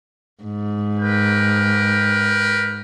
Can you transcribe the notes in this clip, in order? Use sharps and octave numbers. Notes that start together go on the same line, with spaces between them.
G#2
A#4 B4 G5